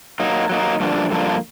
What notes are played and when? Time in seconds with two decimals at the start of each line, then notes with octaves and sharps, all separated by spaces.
0.20 F#3 A#3 D#4
0.50 F#3 A#3 D#4
0.80 G2 D3 F3 A#3 D4
1.11 G2 D3 F3 A#3 D4